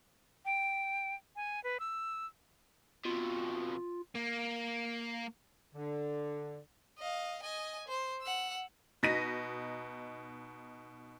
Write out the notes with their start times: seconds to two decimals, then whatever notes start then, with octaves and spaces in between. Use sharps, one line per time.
0.45 G5
1.36 G#5
1.64 B4
1.80 E6
3.05 F2 B2 F4
4.15 A#3
5.75 D3
6.99 D#5 F5
7.42 D#5 G#5
7.88 C5
8.22 F#5 E6
9.03 B2 D#4 A#6 B6 D#7